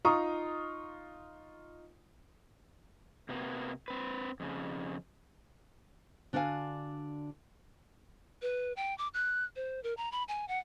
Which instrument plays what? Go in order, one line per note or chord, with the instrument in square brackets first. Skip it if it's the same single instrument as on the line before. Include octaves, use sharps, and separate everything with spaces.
[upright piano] D#4 F4 A#5 C#6 D#6
[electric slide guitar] C3 A#3 B3
C4 B4
F2 C#3
[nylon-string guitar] D3 D4 F#4 C5 F5 G#5
[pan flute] B4
G5
D6
F#6
C5
A#4
A#5
B5
G#5
F#5